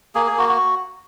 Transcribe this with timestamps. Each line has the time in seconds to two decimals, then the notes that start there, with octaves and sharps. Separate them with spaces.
0.15 A#3 G#4
0.26 G#4
0.32 A#3
0.38 F#4
0.49 F#4